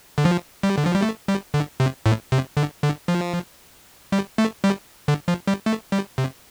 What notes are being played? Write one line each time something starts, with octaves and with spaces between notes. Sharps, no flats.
D3
F3
G3
D3
F3
G3
A3
G3
D3
C3
A2
C3
D3
D3
F3
G3
A3
G3
D3
F3
G3
A3
G3
C3